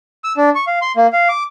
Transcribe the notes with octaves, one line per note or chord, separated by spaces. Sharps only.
E6
D4
C#6
F5
C6
A#3
F5
D6